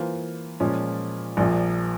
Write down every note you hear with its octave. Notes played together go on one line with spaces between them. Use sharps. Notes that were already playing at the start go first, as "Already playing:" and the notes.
Already playing: E3 A#3 F4 C5 F5
A#2 F3 G#3 C#4 F4
A#1 A#2 F3